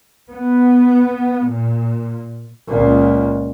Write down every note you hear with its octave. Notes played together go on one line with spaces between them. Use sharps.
B3
A#2
C#2 A#2